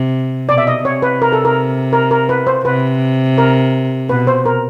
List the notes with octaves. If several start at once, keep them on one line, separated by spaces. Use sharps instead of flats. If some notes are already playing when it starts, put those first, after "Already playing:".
Already playing: C3
B2 D5
E5
D#5
C3 C#5
B4
A#4
A4
A#4
A#4
A#4
B4
C5
C3 B4
A#4
B2 B4
C5
A#4